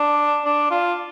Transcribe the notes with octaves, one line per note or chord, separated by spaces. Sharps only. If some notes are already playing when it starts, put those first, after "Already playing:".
Already playing: D4
D4
F4